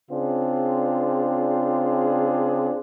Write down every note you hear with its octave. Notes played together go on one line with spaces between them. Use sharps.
C#3 C4 D4 F4 G#4